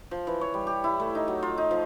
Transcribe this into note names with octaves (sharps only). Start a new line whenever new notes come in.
F3
E3
C#5
G3
G4
E4
A3
D#4
F#3
F4
D#4
F3